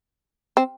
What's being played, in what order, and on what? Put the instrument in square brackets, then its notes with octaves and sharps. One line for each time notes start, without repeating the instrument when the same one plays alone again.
[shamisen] C4